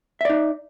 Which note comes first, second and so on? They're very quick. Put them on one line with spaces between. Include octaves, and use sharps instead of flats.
E5 D5 D#4